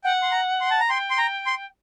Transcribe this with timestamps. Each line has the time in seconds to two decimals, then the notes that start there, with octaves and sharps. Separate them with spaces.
0.04 F#5 G5
0.22 C6
0.32 A#5
0.61 C6
0.71 A5
0.80 A#5
0.89 G5 C6
1.10 C6
1.18 A#5
1.46 C6